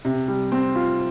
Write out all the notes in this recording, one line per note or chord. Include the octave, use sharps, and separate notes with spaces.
C3
G3
C4
F4